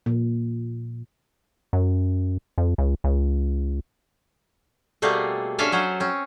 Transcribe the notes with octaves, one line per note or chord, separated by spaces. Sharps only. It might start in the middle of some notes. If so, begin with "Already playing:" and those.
A#2
F#2
F2
C#2
C#2
B2 G3 A3 A#3 C4 G#4
C#4 D4 A4 E5 F5 G#5
F#3 C#4 C5
C4 C#4